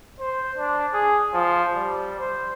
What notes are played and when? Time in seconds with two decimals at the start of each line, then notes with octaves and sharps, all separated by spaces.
0.20 C5
0.58 D4
0.94 G#4
1.34 F3
1.75 G3
2.20 C5